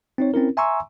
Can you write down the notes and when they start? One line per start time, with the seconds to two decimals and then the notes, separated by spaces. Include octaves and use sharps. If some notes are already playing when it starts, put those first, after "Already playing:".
0.18 C4 D#4 C#5
0.34 C4 C#4 E4 A#4
0.57 E5 G#5 A#5 C6 C#6 E6